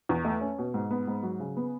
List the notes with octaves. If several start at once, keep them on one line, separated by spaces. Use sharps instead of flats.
E2
A3
C#4
B2
G#2
B3
G#2
F#3
C#3
B3